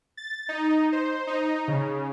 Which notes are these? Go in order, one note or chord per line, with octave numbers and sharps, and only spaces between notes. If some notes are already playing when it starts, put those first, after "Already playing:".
A6
D#4
C5
D#4
C#3